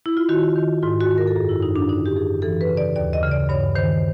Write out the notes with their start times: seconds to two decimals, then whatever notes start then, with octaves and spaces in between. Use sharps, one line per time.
0.06 E4
0.17 F4
0.29 D#3 F#4
0.56 D#3
0.83 G#2 F4
1.00 F#4
1.09 D#3
1.18 A#4
1.27 A4
1.36 F#2 G#4
1.49 E4
1.63 F#2 D#4
1.76 D4
1.89 D3 D#4
2.06 G4
2.16 F#2 G#4
2.42 E3 A4
2.61 B4
2.70 C#3
2.77 D5
2.96 D#2 D5
3.13 D#5
3.23 C#3
3.31 D5
3.49 G2 C#5
3.75 D#3 C5